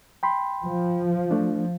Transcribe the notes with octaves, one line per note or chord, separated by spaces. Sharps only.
G5 B5 C6
F3
A3 D4